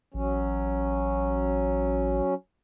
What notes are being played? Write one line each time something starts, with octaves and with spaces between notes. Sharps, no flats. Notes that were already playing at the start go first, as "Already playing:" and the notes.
A1 F#3 C#4